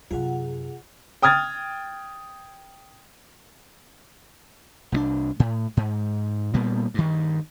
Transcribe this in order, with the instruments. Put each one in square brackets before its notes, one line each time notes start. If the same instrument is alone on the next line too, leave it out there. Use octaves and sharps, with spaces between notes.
[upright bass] F#2 C3 [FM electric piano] F4 G#4 F#5
[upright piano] G5 D#6 F6 G#6 A6
[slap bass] C2 G3 D4
A2
G#2
A#2 G3 A#3 B3
G2 D#3